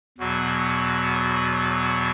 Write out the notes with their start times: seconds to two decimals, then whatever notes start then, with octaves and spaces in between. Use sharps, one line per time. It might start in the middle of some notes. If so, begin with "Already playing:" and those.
0.18 E2 B2 F#3 B3 F#4